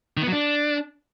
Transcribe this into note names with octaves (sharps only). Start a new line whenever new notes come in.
D#3
B3
F#3
D4